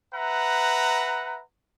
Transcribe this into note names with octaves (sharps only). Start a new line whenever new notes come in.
B4 E5 F#5 A#5